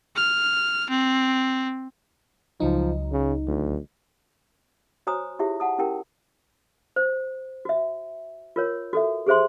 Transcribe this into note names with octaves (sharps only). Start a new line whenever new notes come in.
F6
C4
C#2 F3 F#3 D#4
C#3
D2
F#4 C5 C#5 G#5 A#5 D#6
E4 F4 G4 G#4 C#5 E5
F#5 A5 D#6
C#4 E4 G4 A#4 G5
C5
F#4 E5
F4 A#4 C#5
F#4 A4 E5
G4 G#4 C5 E5 C6